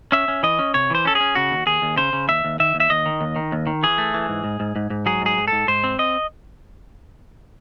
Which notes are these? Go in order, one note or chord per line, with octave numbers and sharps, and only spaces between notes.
C#4 E5
C#4
E3 D#5
C#4
C3 C#5
E3 C5
C#4 A4
G#4
C#4
C#3 F#4
D#2
D#2 G#4
D#2
C#3 C5
C#3
D#2 E5
D#2
D#3 E5
D#2
E5
D#2 D#5
D#3
D#2
D#3
D#2
D#3
E3 G#4
A3
E3
G#2
G#2
G#2
G#2
G#2
F#3 G#4
G#2 G#4
G#2
G#2 A4
G#2 C5
C4
D#5